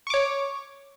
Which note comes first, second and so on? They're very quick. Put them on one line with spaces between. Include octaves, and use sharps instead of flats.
C#6 D6 C#5